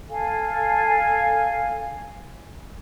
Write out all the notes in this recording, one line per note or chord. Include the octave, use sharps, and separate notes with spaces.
A4 F5 G#5